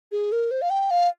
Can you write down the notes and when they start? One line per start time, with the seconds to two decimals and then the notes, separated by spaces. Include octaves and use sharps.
0.12 G#4
0.32 A#4
0.51 C5
0.62 F5
0.70 G5
0.91 F5